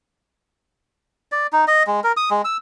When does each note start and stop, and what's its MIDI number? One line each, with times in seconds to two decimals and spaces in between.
1.32 1.47 74
1.53 1.65 63
1.68 1.83 75
1.87 2.00 56
2.04 2.12 70
2.17 2.29 87
2.31 2.42 56
2.45 2.57 88